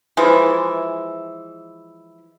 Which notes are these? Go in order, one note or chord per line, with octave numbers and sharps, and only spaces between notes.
E3 F3 G#3 E4